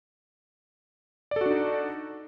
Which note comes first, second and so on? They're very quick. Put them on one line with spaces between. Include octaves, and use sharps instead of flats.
D5 A4 F#4 D4 D#4